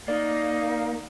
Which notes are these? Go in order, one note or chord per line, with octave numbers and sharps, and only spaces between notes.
A#3 D#4 D5